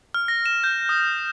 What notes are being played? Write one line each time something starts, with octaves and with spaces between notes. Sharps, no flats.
F6
A#6
E7
G6
D#6